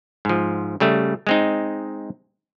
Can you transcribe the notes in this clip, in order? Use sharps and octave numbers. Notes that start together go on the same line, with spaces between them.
G#2 F3
C#3 G3 A3
G#3 C4 D#4